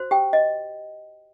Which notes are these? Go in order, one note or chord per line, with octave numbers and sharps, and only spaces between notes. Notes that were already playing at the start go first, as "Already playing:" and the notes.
Already playing: F#4 C5
G4 G5
D#5